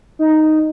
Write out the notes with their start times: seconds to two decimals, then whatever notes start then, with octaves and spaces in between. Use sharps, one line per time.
0.19 D#4